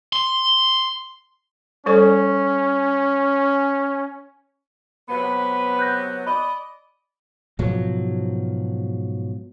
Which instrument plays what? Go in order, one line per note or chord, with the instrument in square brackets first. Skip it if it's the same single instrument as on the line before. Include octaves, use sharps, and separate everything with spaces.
[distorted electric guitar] C6
[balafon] G3 A4 D5 [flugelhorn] C#4
[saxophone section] C3 F#3 B3 [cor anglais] B4
[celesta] F#6 G6 A#6
[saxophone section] D5 D#5 [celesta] B5
[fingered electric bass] G#2 B2 F3 F#3